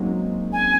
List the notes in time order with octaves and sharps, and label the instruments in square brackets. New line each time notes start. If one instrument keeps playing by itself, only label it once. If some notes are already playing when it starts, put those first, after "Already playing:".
Already playing: [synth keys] F#3 G#3 A#3 C4 C#4 D#4
[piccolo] G#5